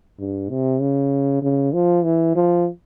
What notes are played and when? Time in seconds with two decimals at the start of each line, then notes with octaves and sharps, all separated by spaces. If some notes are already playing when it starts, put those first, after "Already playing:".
0.19 G2
0.50 C3
0.81 C#3
1.42 C#3
1.74 F3
2.04 E3
2.36 F3